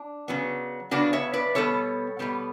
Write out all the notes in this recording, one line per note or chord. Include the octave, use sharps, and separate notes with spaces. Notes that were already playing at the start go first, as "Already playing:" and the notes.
Already playing: D4
C#3 F#3 B3
C#3 F#3 B3 D4 F#4
C#5 E5
B4 D5
B2 G3 B3 A4 C#5
B2 G3 B3